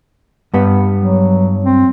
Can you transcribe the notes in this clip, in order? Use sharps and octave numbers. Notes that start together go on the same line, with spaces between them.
G2 B3
F#3
C4